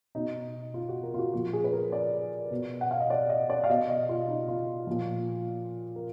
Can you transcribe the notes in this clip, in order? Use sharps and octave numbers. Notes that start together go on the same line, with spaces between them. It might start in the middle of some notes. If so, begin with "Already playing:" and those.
B2 D#4
F4
F#4
A#4
F4
F#4
A#2 F3 F#4
G#4
B4
A#4
D5
B2
F#5
F5
D#5
D5
D#5
D5
F5
B2 D#5
D#5
F4
D#4
F4
A#2 F3
A#4